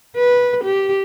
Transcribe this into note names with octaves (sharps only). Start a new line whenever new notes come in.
B4
G4